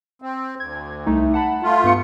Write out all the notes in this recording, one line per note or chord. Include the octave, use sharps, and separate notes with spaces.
C4
D2 G#6
C2 A3 D#4
F#5 A5 B5
A3 F4
G2 B3 C#7